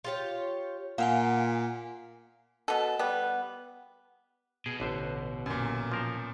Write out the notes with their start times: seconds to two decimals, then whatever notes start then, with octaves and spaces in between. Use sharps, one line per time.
0.05 F4 G4 C#5
0.98 A#2 A#3 F5 F#5 G#5
2.68 B2 A4
2.99 G3 B3
4.66 B2 G#4
4.80 A1 D3 C5
5.46 F#2 A#2
5.92 F3 A#4 C5